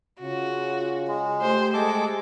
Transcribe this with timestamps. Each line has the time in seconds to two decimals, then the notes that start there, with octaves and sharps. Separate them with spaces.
0.21 C#3 F4 F#4
1.08 G#3
1.41 A3 G4 C5
1.74 G#3 A4 D6